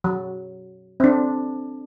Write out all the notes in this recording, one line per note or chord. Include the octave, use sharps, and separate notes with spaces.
F#3
C4 D4